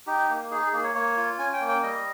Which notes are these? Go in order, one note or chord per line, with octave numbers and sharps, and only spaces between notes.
D#4 G4
A#3
D#4 G#4
G#4
A#3 G#4
C#5
A#3 C#5
F4
C#4 G#5
G5
A#3
G5
G3 D#5